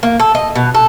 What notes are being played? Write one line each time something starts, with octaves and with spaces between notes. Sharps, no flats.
A#3
A4
D#5
B2
A4